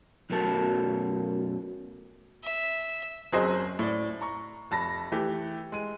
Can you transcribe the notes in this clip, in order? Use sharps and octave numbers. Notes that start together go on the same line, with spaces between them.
B1 F#2 F#3 A3 A#4 A5
E5
F#1 F#3 C4 G#4 C5 D#5
A2 D5
A#5 C#6
F1 A5 B5 A#6
E3 A3 G4
G#3 D#7